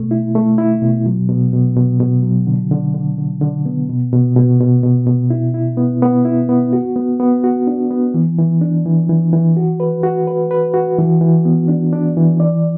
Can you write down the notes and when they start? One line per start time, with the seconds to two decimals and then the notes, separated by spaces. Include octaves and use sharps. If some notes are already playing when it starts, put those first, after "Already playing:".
Already playing: B2 A3
0.11 E4
0.35 A3
0.58 E4
0.82 B2
1.06 F#3
1.29 B2
1.53 B2
1.77 B2
2.00 B2
2.23 F#3
2.47 D3
2.71 D3
2.95 D3
3.18 D3
3.41 D3
3.66 B3
3.89 B2
4.13 B2
4.37 B2
4.60 B2
4.83 B2
5.07 B2
5.30 E4
5.54 E4
5.77 B3
6.02 B3
6.25 E4
6.49 B3
6.73 F#4
6.96 B3
7.20 B3
7.44 F#4
7.67 D4
7.91 B3
8.14 E3
8.38 E3
8.61 D4
8.86 E3
9.09 E3
9.33 E3
9.57 F#4
9.80 B4
10.03 F#4
10.27 B4
10.51 B4
10.74 F#4
10.98 E3
11.21 E3
11.45 B3
11.68 D4
11.93 D4
12.17 E3
12.40 D5